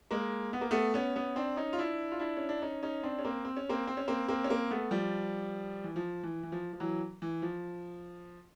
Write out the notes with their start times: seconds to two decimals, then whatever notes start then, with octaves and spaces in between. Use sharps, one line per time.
0.11 G#3 A#3
0.53 B3
0.61 A#3
0.71 A3 B3
0.94 B3 C#4
1.16 B3 C#4
1.36 C4 D4
1.57 C#4 D#4
1.73 F4
1.78 D4 E4
2.11 F4
2.19 D4 E4
2.37 C#4
2.49 D4
2.62 C#4 D#4
2.83 C#4 D#4
3.03 C4 D4
3.19 C#4
3.24 A#3 C4
3.45 C4
3.57 C#4
3.69 A#3 C4
3.87 C4
3.97 C#4
4.08 A#3 C4
4.28 A#3 C4
4.44 C#4
4.50 A#3 C4
4.70 A3 B3
4.91 F3 G3
5.84 E3
5.96 F3
6.23 E3
6.43 E3
6.52 F3
6.73 F3
6.80 E3 F#3
7.22 E3
7.42 F3